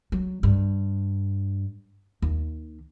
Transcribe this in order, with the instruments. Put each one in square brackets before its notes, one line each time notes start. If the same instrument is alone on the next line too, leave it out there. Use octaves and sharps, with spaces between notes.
[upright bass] F#3
G2
D#2